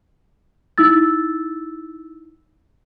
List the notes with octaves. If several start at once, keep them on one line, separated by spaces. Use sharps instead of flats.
D#4 E4 E6 A6